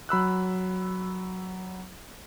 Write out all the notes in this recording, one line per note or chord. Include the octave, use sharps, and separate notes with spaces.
F#3 B5 E6 F#6